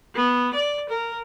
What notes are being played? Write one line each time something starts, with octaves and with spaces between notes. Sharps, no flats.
B3
D5
A#4